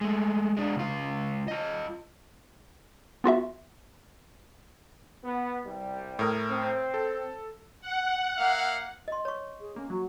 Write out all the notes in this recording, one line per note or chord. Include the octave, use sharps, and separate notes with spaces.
G#3 A3
G#3 D4
C#2 F4
F4 D#5
B3 F4 F#4 E5
B3
C2 G3
A2 A#4 D#6
C4
A4
F#5
A#3 E5 F5
D#5 C6
C#5 C#6
G#4
A#3 C#4
F#3 F#4